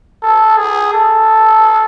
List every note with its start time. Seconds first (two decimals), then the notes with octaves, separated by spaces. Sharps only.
0.23 A4
0.57 G#4
0.93 A4